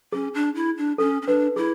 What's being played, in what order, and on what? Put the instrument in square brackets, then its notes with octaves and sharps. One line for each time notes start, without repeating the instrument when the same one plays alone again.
[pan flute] C#4 [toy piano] G#4
[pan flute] D4
E4
D4
[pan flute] C#4 [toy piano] A4
[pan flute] C#4
[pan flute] D4 [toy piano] B4
[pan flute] E4 [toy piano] G#4